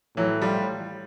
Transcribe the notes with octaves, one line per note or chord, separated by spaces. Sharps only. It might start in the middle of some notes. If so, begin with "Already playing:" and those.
A2 E3 F#3
F3 G3